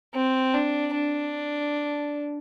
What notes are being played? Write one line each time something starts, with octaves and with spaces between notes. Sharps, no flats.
C4
D4
D4